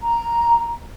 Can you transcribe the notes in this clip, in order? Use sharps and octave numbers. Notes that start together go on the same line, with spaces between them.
A#5